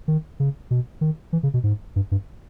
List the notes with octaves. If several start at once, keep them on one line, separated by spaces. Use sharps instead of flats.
D#3
C#3
B2
D#3
E3
C#3
B2
G#2
G2
G2